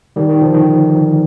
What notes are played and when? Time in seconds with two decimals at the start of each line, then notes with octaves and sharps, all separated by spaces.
0.16 D#3 G3
0.29 D#3
0.41 D3 F3
0.54 D#3